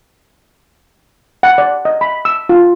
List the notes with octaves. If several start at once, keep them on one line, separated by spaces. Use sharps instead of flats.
F#5
D5
D#5
B5
E6
F4